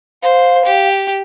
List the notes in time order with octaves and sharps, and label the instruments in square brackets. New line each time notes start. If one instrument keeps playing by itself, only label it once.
[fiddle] C5 [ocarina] F5
[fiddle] G4